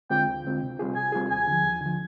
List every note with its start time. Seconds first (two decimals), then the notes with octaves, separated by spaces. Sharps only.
0.10 D3 G#3 C4 F4 G5
0.27 D2
0.44 D3 G#3 C4 F4
0.62 C3
0.79 G3 C4 F4 G#4
0.96 C3 G#5
1.12 G3 C4 F4 G#4
1.30 D#2 G#5
1.47 D3 F3
1.64 D#2
1.81 D3
1.86 F3